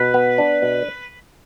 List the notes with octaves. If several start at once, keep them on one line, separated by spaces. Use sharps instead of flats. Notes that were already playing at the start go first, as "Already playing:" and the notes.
Already playing: B2 B4
B3
D4
B2